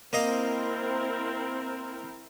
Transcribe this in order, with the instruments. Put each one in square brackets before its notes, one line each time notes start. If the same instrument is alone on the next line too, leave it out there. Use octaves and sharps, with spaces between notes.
[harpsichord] A#3 D#5 F5 [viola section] C4 E4 A#4